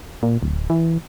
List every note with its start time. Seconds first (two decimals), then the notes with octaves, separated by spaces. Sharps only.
0.23 A#2
0.43 D1
0.70 E3